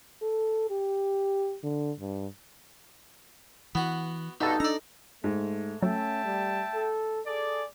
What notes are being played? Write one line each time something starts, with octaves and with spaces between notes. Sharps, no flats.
A4
G4
D3
G2
E3 B3 F#4
G2 B2 D#4 A4
D4 D5 A#5
G#2 A3
F#3 A3 C#4 E5 G5 A5
G3
A4
G#4 A4 D5